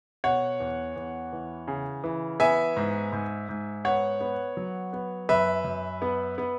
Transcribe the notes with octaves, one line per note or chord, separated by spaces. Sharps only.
B2 C#5 F#5
E2
E2
E3
C#3
E3
B3 E5 G#5
G#2
G#2
G#2
B3 C#5 F#5
B3
F#3
B3
F#2 B4 E5
F#2
B3
B3